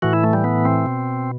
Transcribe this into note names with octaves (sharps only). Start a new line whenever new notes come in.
A2 E3 F#4
E4
A3
G3
B3
C4
B2